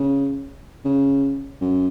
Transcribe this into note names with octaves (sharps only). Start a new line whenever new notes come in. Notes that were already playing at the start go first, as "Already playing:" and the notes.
Already playing: C#3
C#3
F#2